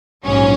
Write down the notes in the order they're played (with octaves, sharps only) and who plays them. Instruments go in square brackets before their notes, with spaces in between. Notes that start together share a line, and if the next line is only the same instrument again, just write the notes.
[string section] A#1 G#2 F#3 C#4